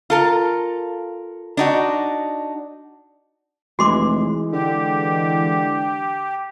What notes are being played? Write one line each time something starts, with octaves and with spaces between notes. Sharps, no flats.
F4 A4 A#4
D4 D#4 F#4
F1 E3 G#3 F#4 C6 D6
D3 G4